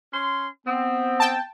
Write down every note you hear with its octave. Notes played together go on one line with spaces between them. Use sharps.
C#4 C6
B3 C4
G5 A5